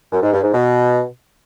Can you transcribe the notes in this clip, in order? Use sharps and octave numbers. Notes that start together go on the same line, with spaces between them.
F#2
G#2
G2
G#2
B2